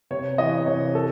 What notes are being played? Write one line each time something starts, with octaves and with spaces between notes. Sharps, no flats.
C3 C#5
E3 D#5
C3 C#5
A4